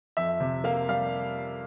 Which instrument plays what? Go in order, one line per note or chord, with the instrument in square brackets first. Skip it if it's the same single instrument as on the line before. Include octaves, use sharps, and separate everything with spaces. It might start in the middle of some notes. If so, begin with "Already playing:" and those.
[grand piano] F2 E5
C3
A#3 F5
G3 F5